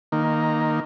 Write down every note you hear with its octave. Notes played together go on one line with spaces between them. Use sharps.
D#3 A#3